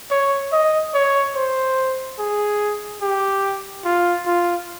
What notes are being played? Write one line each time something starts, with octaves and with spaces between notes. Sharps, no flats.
C#5
D#5
C#5
C5
G#4
G4
F4
F4